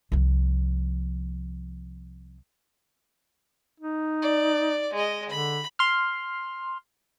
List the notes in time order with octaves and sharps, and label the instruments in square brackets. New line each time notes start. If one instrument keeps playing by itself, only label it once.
[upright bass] C2 F3
[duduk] D#4
[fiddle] D5
G#3 D#5
[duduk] D3 [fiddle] B5
[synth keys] C6 F6